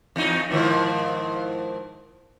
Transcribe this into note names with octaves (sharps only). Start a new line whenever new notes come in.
E2 D#4
G#2 D#3 F3